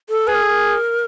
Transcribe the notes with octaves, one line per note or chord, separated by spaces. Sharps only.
A4
G#4 B4
A#4
A4
A#4